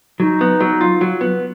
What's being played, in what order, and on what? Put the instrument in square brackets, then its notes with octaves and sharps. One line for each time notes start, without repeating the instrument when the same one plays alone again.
[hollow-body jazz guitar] F#3 [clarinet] D#4
[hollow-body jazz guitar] B3
F#3
F4
F#3
B3